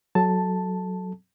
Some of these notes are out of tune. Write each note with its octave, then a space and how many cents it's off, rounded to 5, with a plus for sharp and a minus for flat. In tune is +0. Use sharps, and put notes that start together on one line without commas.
F#3 +0 A4 -20 A5 +0